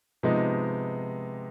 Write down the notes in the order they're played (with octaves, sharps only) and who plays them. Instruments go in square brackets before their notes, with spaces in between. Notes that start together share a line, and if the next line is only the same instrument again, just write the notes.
[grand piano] C3 F3 G#3 B3 D#4